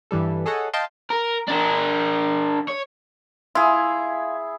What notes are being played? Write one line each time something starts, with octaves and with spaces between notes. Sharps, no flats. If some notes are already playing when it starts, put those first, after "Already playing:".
G2 E3 G3 A4
G#4 A4 C#5 D#5 F#5
D#5 F5 G5 A5 C6 G6
A#4
D4 A#4
C#5
E4 F4 G#4